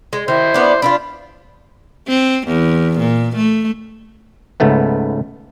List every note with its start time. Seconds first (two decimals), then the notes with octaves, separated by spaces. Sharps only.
0.13 G#3
0.28 D#3 E4 C5
0.54 B3 D4
0.82 D4 E4 F4 B5
2.08 C4
2.48 E2
2.99 A#2
3.36 A3
4.60 C#2 G#2 A3 B3